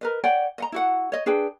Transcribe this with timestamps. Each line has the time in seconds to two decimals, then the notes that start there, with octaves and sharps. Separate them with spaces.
0.01 A#4 B4 D#5
0.24 C#5 D5 F#5 G5
0.58 D#5 F#5 A#5
0.72 E4 F#4 F#5
1.12 C#5 D#5
1.26 D4 G#4 B4 G5